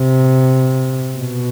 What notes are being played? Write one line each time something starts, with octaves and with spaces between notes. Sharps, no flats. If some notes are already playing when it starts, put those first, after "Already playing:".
Already playing: C3
B2